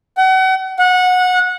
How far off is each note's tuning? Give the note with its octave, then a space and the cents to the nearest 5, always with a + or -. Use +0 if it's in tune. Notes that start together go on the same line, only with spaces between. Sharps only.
F#5 +35
F#5 -20